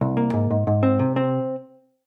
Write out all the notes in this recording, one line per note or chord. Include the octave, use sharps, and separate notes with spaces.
C2
A#3
G#2
G#2
G#2
C4
C3
C4